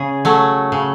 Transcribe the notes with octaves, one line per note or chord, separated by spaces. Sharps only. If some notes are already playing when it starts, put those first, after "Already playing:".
Already playing: C#3 G#4
F#3 A3
C#3